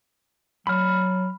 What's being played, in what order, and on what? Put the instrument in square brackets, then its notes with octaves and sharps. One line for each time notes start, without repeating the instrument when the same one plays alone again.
[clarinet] F#3 [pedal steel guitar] B5 F6